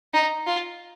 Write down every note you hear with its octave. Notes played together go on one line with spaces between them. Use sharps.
D#4
F4